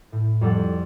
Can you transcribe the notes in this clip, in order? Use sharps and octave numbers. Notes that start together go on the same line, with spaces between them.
A2
F2 G3 A4 F#5 A6